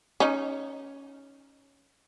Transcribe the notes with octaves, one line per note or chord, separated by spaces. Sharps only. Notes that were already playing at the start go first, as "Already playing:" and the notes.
C#4 D#4